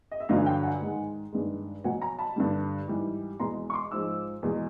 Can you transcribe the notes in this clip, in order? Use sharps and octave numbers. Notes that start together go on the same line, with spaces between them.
D#5
E5
G2 D3 F#3 D#5 F5
G#5
F5 G5
F#5 G#5
G#2 D#3 G#3
G2 D#3 G#3
B2 F#3 F#5 G#5
G#5 A#5
A5 B5
G2 D3 G3
G#2 E3 G3
E2 B2 G#3 A#5 C6
C#6
C6 D6
G#2 F3 G#3 D6 E6
E2 B2 G#3